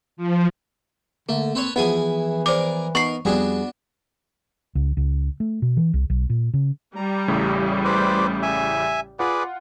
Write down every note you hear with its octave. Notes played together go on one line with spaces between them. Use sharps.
F3
D3 A3 A#3
C4 A4 B4 C#5
E3 F3 B3 E4 G#4 G#5
G#4 A#4 C5 D5 D6
B3 D#4 A#4 C#6 C7
F2 G3 B3 D4 F#4 G#4
C#2
C#2
A3
B2
E3
C2
B1
A#2
C#3
G3 A#5
A1 A2 C#3
B4 C5 D5
E5 G#5
F4 G#4 B4 D5 F#5